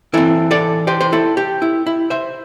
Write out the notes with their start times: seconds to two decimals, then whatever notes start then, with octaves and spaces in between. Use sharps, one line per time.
0.14 E3 C4 E4 A4
0.51 A4 D5
0.87 G4 C5
1.01 C5
1.12 E4 A4
1.37 G4
1.62 E4
1.87 E4
2.10 C5 E5